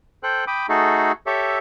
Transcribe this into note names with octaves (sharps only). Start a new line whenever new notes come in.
A4 C5 G5 F#6
G5 B5 D6 D#6
A3 D#4 F#4 G#4 A4
G4 A4 C#5 E5